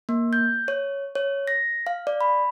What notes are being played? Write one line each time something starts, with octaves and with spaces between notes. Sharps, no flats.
A#3
G6
C#5
C#5
A#6
F5
D5
B5